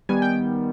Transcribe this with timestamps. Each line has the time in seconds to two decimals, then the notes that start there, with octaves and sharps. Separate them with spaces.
0.09 D#3 G3 B3 G#5
0.22 G5